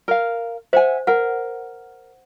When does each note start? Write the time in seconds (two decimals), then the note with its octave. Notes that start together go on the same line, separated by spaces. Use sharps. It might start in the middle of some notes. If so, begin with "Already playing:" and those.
0.08 A#4 F5
0.73 C5 E5 F#5 G#5
1.07 A#4 F#5